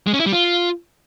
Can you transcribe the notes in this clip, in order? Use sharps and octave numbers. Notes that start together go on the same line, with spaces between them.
G#3
C#4
E4
G3
F4